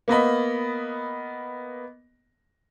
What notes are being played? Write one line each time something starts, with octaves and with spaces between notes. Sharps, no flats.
A#3 B3 D#5 B5